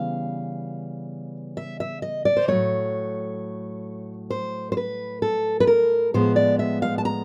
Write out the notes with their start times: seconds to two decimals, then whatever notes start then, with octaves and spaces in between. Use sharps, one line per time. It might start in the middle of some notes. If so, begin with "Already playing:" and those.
Already playing: C#3 E3 G3 B3 F5
1.57 E5
1.80 E5
2.02 D#5
2.25 D5
2.37 C5
2.48 A2 F#3 A3 C#5
4.30 C5
4.72 C5
4.77 B4
5.22 A4
5.60 B4
5.67 A#4
6.14 A2 F3 G#3 B3 C5
6.36 D5
6.59 E5
6.82 F5
6.98 A5
7.05 A#5